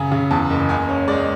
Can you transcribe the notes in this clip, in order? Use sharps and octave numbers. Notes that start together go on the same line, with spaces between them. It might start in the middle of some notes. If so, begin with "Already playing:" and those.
Already playing: F#2 C#3 G#5
C#3
E2 A5
F#1
C#2 G#5
C#4
G#3 D5